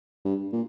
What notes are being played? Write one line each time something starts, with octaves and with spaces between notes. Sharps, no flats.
G2
A#2